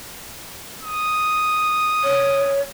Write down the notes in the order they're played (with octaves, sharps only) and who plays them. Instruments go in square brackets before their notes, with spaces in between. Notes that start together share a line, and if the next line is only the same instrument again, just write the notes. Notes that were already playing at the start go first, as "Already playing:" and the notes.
[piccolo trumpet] D#6
[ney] C#5